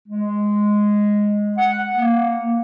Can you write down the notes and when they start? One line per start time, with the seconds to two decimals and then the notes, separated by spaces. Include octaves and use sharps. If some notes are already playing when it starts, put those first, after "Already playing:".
0.08 G#3
1.58 F#5
1.95 A#3